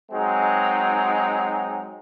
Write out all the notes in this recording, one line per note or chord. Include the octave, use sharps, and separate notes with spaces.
F#3 G#3 C4 D#4